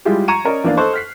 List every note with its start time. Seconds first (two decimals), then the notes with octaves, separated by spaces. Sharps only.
0.05 G3 G#3 E4 F4 G4 G#4
0.28 A#5 C#6 G#6 C#7 D#7 E7
0.45 C#4 A#4 D5 D#5
0.64 E2 A#3 D4 D5 F5
0.77 A4 C5 D#5 C#6 F#6
0.94 F6 B6 C7